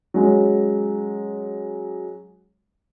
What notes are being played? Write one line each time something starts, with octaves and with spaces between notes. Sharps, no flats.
F#3 G#3 C#4